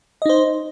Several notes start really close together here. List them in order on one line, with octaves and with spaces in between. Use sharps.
D#5 D#4 C5